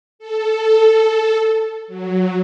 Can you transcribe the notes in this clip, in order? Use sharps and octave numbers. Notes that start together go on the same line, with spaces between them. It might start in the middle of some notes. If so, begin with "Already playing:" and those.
A4
F#3